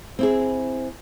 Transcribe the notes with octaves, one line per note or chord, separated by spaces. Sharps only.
C4 E4 G#4